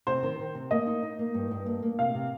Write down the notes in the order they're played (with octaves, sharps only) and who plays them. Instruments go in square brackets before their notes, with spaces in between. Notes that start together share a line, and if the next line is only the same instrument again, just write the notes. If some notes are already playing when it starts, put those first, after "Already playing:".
[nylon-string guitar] C3 [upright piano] C5
[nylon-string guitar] D#3
D#3
C3
[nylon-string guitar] A#3 [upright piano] D#5
[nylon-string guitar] D#4
D#4
A#3
G2
G2
A#3
A#3
[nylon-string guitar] C3 [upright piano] F5
[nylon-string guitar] C3